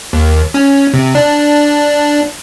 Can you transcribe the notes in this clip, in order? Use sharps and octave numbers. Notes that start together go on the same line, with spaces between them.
D#2
C#4
C3
D4